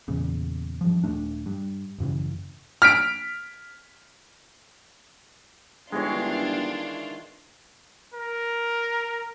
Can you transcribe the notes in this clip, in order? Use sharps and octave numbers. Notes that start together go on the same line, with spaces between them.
E2 A#2 C#3
G2 F3
D#1 A3 D4
G2
A1 F#2 C#3 E3
F6 B6 D7
G1 D#3 E3 G#3 D4 F4 C#5
A#4